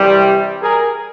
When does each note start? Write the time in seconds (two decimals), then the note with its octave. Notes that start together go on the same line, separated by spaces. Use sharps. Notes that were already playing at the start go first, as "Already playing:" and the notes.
Already playing: C2 C3 E3 G3
0.62 G#4 A#4